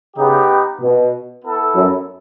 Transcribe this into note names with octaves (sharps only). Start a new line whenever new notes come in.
C#3 B3 D#4 G4
B2
B3 E4 A4
F#2